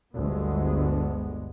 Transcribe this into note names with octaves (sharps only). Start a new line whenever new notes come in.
G1 D2 G#3 B3